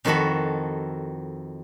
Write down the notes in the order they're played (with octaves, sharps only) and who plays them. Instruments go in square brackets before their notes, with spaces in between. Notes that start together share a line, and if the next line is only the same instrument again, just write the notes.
[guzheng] F2 D#3 E4 F#4 A4 B5